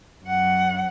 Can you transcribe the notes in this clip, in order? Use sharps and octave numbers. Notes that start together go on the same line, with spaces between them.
F#2 F#5